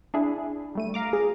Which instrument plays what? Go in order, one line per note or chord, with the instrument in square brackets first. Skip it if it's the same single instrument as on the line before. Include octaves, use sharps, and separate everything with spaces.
[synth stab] D4 E4 G#4
G3 A3 D#7
F5 A#5 D6
[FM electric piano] G#4